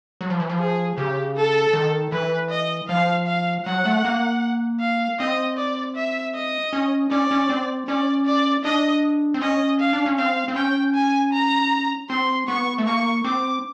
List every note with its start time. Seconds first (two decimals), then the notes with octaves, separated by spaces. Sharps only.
0.21 F#3
0.30 F3
0.40 E3
0.49 F3
0.59 G#4
0.97 C#3 G4
1.36 A4
1.73 D#3
2.12 E3 B4
2.50 D#5
2.89 F3 F5
3.27 F5
3.65 F#3 F#5
3.85 A3
4.05 A#3
4.80 F5
5.19 C4 D#5
5.58 D5
5.96 E5
6.35 D#5
6.73 C#4
7.11 C#4 D5
7.31 C#4
7.49 C4
7.88 C#4 D5
8.26 D5
8.65 D4 D#5
9.34 C4
9.42 C#4 D#5
9.80 F5
9.93 D4
10.06 C#4
10.18 C4 F5
10.48 C4
10.56 C#4 G5
10.95 G#5
11.33 A#5
12.10 C4 C6
12.48 B3 C#6
12.78 A3
12.86 A#3 C#6
13.25 C4 D6